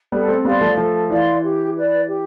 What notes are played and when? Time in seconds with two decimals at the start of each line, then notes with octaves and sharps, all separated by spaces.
0.12 G3 B3 A4
0.28 A3 C4
0.45 G3 B3 D5 F5 C6
0.61 F3 A3
0.77 F3 A3 A4
1.10 E3 D5 F5 C6
1.42 G4
1.75 B4 D5
2.07 G4